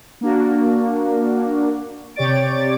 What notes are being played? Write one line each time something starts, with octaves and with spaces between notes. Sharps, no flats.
A#3 D4 F#4
C3 G4 C#5 D5 A6 D7